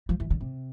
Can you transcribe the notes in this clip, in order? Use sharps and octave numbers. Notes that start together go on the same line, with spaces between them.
F3
E3
D3
C3